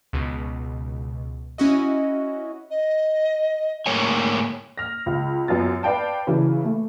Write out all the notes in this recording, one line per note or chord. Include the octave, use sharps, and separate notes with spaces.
C#2 B2
C#4 E4 F#4 D#5
D#5
G#2 A3 A#3 A#4 C#5 G#5
F6 A#6
C#2
F#2 B3 F4 A6
B4 D5 F5 G5 A5
C#3 E3 F#3
A3